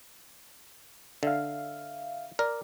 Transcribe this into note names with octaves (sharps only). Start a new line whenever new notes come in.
D3 E5 F5
A#4 D5